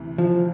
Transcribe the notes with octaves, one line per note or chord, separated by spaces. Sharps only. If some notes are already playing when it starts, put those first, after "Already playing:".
Already playing: D2 C3 E3
F3